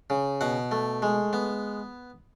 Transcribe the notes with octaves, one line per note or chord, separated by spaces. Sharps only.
C#3
B2 F#5
A3
G#3
B3